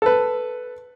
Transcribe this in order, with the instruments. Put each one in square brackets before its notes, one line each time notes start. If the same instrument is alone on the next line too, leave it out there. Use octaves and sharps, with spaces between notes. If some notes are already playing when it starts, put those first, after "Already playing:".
[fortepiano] A4 B4